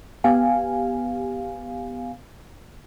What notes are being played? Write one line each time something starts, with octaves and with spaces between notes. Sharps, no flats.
B3 G4 F5 G#5